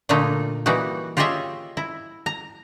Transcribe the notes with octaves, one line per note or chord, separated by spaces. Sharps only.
A#2 D3 A3 A#3 D#4
E3 G3 A#3 D#4 F#4
F4 G4 G#4 C#5 D#5 E5
E4
A#5